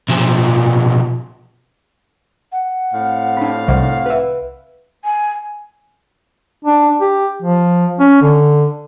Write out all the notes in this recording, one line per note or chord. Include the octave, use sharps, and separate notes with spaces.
B1 F3
F#5
A2 C4 F5
D4 B5
C2 F#5
B4 E5
G#5
D4
G4
F3
C#4
D3